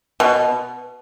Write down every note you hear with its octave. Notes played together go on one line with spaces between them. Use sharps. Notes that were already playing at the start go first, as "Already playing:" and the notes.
B2